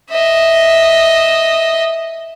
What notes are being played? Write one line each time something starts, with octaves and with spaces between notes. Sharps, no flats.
D#5 E5